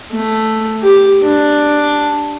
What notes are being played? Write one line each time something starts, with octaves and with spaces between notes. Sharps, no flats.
A3
G4
D4